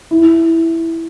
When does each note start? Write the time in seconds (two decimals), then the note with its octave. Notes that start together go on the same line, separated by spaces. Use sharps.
0.11 E4